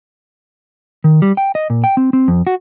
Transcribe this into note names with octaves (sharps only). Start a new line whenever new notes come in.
D#3
G3
G5
D#5
A#2
G5
C4
C4
F2
F#4